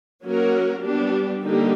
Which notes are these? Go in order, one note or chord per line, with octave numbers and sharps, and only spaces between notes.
F#3 A#3 C#4 F#4 A#4
G3 B3 D4 G4
D3 G3 A#3 D#4 G4